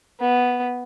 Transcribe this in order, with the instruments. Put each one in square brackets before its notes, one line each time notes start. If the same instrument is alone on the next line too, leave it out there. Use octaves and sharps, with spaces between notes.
[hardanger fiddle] B3